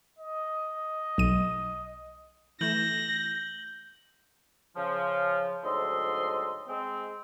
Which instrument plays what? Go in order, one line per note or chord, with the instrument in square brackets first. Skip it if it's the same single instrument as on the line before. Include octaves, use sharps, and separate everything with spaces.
[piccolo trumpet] D#5
[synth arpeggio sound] B1 D#7
[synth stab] E3 A3 E7 [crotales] G6 F#7 G7 [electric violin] A#6
[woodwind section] C#3 F3
D2 G#2 F#3 A4 D#5 C6
G#3 C4